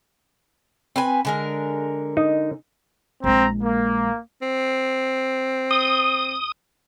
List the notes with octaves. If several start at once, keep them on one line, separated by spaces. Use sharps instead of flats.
C4 B4 G#5
D3 G#3 A#4
D#4
A#1 G#3 C4 A#5
A#3
C4
D#6